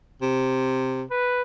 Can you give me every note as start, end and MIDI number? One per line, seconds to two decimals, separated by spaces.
0.22 1.03 48
1.11 1.42 71